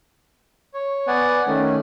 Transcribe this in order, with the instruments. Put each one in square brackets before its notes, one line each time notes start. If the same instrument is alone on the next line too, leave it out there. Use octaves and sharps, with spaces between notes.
[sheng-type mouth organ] C#5
[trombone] B3 [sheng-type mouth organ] D5 F#5 G#5
[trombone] D#3 [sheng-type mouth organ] A3 C#4